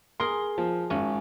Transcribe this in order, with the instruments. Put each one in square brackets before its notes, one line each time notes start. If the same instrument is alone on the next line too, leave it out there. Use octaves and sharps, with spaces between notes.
[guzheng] G#4 A#4 [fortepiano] C6
[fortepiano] F3
[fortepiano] G#1 [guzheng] C#4